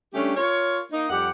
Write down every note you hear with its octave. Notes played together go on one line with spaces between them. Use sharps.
G3 A3 C#4 D4 G4
F4 A#4 C#5
A#3 D#4
F2 G3 G4 F#5